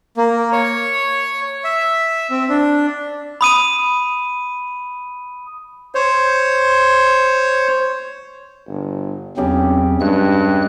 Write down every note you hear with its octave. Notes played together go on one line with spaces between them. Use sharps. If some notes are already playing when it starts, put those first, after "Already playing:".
A#3
C#5
E5
C4
D4
B5 D#6 D#7
C5 C#5
G1
B1 E2 C#3 F#3 C4 G4
G2 G#3 F#6